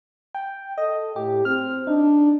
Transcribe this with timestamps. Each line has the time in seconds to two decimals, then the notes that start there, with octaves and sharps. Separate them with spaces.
0.35 G5
0.78 A4 D#5
1.16 A2 G4
1.45 C4 F6
1.87 D4 D#4